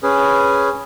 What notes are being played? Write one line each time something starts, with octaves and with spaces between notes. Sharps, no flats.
C#4 G#4 B4